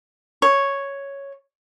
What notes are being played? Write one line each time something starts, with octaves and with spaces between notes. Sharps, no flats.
C#5